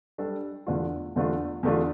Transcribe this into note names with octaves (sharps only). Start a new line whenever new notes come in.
G3 D4 A4
E2 D3 A3 D4 F4
E2 D3 A3 D4 F4
E2 D3 A3 D4 F4